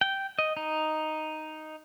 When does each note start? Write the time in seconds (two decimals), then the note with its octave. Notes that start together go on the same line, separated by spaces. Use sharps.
0.01 G5
0.39 D#5
0.57 D#4